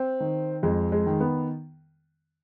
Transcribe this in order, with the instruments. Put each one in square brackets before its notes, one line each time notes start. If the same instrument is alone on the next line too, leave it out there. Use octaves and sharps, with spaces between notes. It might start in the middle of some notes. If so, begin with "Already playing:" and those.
Already playing: [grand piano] C4
D#3
F2 G#3
G#3
D#3
B3